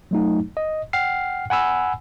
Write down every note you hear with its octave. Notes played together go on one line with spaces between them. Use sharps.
F#3 A3 D#4
D#5
F#5 G5 F6 C7
F#5 G#5 B5 E6